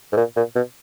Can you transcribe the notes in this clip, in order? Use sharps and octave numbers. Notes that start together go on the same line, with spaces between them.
G#2
A#2
A#2
B2